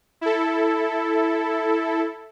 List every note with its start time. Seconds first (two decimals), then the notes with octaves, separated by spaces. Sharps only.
0.21 E4 A4